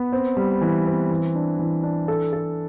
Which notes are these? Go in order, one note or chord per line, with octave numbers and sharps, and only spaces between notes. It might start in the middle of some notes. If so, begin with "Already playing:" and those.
Already playing: B3
C4
G3
E3
C4
E3
D4
E3
D4
A4
A4